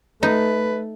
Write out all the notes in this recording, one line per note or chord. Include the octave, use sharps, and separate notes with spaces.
A3 D#4 B4